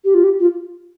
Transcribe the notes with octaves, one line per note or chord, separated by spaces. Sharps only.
G4
F4
G4
F4